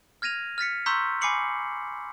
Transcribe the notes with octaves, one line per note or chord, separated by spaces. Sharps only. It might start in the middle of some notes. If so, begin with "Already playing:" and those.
F6 G#6 A#6 D#7 F7
F6 A6 B6 C#7
A#5 C6 C#6 E6 G6 B6
G#5 B5 D6 C7 C#7 F#7